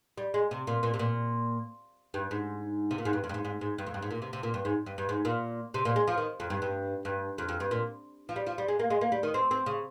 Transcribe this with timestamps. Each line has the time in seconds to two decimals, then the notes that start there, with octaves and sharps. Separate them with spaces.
0.18 G3
0.34 G#3
0.51 C3
0.67 A#2
0.83 A#2
0.94 C3
0.99 A#2
2.14 G2
2.31 G#2
2.91 C3
2.98 A#2
3.05 G#2
3.13 G2
3.24 F2
3.29 G2
3.34 G#2
3.45 G#2
3.61 G#2
3.78 G2
3.87 F2
3.94 G2
4.02 G#2
4.11 A#2
4.22 C3
4.33 C3
4.43 A#2
4.54 G2
4.65 G#2
4.86 G2
4.98 G2
5.09 G#2
5.25 A#2
5.74 C3
5.85 A#2
5.96 G#3
6.08 F3
6.18 D#3
6.40 F2
6.50 G2
6.62 G2
7.05 G2
7.38 F2
7.49 F2
7.60 G2
7.71 A#2
8.29 F3
8.36 G3
8.47 F3
8.58 G3
8.68 G#3
8.79 A#3
8.90 G#3
9.01 A#3
9.12 G3
9.23 D#3
9.34 C4
9.51 C4
9.66 C#3